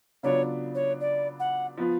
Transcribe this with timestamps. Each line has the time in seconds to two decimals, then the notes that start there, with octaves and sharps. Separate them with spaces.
0.23 C#3 F#3 B3 D4 F4 C#5
0.75 C#5
1.01 D5
1.40 F#5
1.77 F3 B3 F4